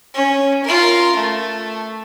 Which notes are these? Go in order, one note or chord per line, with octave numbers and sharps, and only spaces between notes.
C#4
F4 A#4
A3